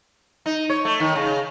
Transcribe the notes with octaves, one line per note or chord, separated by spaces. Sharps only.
D#4
C#5
A3
D#3
C#3